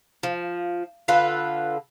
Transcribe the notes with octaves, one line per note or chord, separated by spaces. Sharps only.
F3
D3 F4 A4 B4